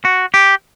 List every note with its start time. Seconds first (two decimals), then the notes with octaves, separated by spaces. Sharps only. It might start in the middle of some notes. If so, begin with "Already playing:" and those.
0.05 F#4
0.34 G4